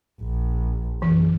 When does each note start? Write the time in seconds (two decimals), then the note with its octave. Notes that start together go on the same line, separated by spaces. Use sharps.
0.21 A#1
1.02 F#1 E3